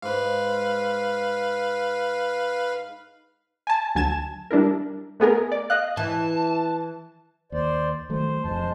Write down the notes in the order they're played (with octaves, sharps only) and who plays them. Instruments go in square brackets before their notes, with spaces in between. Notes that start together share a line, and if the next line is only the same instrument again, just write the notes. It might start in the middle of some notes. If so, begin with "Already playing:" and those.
[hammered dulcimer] G#2 [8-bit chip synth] B4 F5
[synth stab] G#5 A5
D2 F#3 G#5 A5 G#6 E7
G3 D4 E4 A#4
A3 B3 G#4 A#4
D5
D#5 F5 F#6
[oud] E3 [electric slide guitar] A5
[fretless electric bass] D#2 [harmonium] C5 D5
[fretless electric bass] D#3 F#3 A3 [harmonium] C5
[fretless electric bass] E1 F2 [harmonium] G#3 C5 A5